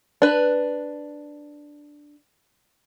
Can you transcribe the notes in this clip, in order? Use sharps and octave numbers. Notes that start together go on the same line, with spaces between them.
D4 B4